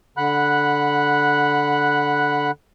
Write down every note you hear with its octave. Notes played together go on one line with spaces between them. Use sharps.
D3 F#5 B5 F#6